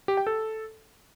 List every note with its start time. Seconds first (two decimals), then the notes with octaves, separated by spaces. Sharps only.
0.08 G4
0.17 G5
0.27 A4